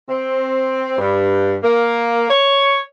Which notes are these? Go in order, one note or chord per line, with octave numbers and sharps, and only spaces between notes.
C4
G2
A#3
C#5